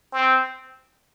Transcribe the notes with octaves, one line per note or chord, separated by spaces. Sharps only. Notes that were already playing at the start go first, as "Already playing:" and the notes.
C4